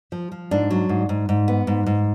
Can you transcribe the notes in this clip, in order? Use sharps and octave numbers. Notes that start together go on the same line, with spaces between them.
F3
F3
G#2 D4
F#3
G#2
G#2
G#2
B3
G#2
G#2